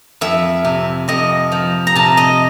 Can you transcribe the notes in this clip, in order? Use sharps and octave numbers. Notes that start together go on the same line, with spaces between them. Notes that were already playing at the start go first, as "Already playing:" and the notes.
F2 E5
C3
F2 D#5
F3
A#5
C3 A5
D#5